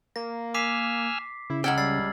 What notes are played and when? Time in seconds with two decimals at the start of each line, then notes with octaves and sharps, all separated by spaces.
0.16 A#3 A#6
0.54 G#5 D6 E6 F6 B6 C7
1.50 C#3 E4
1.64 C#2 F#5 G5 E6 F6 G#6 F#7
1.78 G3 E6 A6 C7